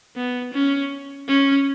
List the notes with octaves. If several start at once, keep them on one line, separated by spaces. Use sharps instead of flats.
B3
C#4
C#4